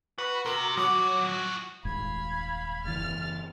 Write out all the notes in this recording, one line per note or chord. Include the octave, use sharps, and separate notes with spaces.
F#4 B4
C3 F#4 A#4
F3 F#3 F#4 D6
D#1 G#1 G#2 F5 B5 G#6
F#1 E3 F6 A6